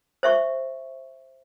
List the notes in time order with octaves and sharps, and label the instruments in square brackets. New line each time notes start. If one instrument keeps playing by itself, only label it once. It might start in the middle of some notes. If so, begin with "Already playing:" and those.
[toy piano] C5 E5 C#6